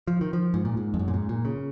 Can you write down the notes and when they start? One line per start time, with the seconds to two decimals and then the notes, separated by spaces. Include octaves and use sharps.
0.07 F3
0.21 D#3
0.33 F3
0.54 G#2
0.65 A#2
0.77 G#2
0.94 F2
0.99 F#2
1.08 A#2
1.14 G#2
1.29 A#2
1.45 C#3